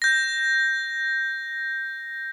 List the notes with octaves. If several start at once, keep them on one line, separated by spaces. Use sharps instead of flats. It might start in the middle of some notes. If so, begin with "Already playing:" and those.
G6 A#6